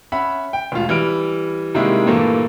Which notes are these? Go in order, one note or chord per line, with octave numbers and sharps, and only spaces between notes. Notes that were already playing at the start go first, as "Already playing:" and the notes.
C#4 E5 F#5 B5
G5
E1 A2 F4
E3 G3 F6 D7
C3 D#3 G3 G#3 A#3 E4
G2 A#2 E3 A3 A#3